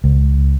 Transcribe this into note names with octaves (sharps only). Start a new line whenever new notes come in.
C#2